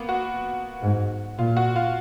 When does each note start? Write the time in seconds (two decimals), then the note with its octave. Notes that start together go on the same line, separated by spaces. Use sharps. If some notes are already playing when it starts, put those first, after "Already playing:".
Already playing: A#3 B3
0.09 F#4
0.82 G#2
1.38 A#2 F4
1.57 F#4
1.76 F4